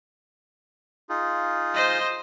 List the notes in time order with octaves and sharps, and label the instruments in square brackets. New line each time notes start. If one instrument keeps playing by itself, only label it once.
[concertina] D#4 F4 G#4
[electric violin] C5 D#5